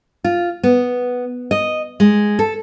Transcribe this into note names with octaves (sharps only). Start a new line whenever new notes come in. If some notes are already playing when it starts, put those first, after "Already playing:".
F4
B3
D#5
G#3
A4